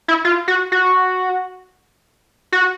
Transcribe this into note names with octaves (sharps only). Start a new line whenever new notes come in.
E4
F4
F#4
F#4
F#4